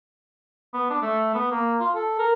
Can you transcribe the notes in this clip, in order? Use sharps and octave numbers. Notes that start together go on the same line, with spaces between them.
B3
D4
A3
B3
A#3
F4
A4
A#4